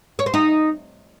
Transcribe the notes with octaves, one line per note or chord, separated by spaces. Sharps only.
C#5
C5
D#4